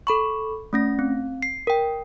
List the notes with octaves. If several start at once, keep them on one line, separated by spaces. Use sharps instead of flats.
A4 B5 C#6
A3 C#4 A#6
C4
C7
A#4 G5